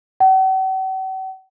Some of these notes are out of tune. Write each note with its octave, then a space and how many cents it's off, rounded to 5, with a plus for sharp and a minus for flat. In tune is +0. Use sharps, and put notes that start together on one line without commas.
F#5 +45